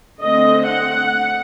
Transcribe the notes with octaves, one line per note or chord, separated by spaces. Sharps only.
D3 A3 C4 D#5
F#5